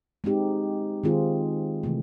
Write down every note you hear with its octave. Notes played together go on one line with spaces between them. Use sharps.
G#3 C4 D#4 G4
D#3 G#3 C4 F4 G#4
C3 E3 A3